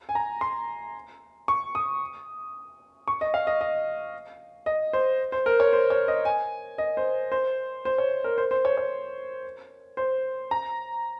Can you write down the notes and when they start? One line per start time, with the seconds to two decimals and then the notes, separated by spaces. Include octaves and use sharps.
0.09 G#5
0.15 A#5
0.41 C6
1.48 C#6
1.75 D#6
3.08 C#6
3.21 D#5
3.34 F5
3.47 D#5
3.61 D#5
4.66 D#5
4.93 C5
5.32 C5
5.46 A#4
5.60 C#5
5.73 C5
5.90 C#5
6.08 D#5
6.25 G#5
6.78 D#5
6.97 C5
7.32 C5
7.85 C5
7.98 C#5
8.24 A#4
8.38 C5
8.51 C5
8.65 C#5
8.77 C#5
9.97 C5
10.51 A#5